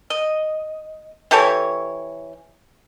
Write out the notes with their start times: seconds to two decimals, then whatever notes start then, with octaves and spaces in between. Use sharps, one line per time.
0.10 D#5
1.31 E3 G4 A4 C#5